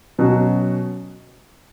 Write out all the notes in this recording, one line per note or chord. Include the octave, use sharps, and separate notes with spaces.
B2 F#3 C#4 F#4